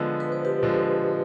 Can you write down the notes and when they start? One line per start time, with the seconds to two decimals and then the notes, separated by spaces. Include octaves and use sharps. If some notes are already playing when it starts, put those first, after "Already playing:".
Already playing: D3 F3 G#3 B3
0.20 B4
0.32 C5
0.45 G4 B4
0.63 D3 F3 G#3